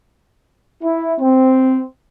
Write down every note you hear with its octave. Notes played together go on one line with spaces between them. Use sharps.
E4
C4